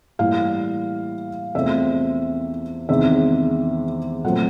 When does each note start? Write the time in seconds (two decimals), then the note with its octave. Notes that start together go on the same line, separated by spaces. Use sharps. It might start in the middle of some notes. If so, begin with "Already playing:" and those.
0.19 A2 E3 G3 A#3 F5
1.55 E2 C3 F3 A3 C4 E5
2.89 E2 C3 D#3 G#3 E5
4.24 A#2 F#3 A3 C4 F#5